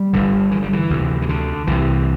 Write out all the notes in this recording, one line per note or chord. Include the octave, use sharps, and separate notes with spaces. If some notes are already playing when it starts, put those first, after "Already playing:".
Already playing: G3
G1 G2 D3
E3
G3
E3
D2 C3
E3
D3
C2 C3 E3